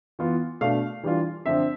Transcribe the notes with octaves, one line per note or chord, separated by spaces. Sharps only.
E3 B3 F4
B2 A3 D4 F5
E3 G3 D4 F4
D3 F3 C4 E5